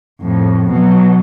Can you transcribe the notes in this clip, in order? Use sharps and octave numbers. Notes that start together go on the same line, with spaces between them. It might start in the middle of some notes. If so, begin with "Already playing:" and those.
F2 A2
B2 F#3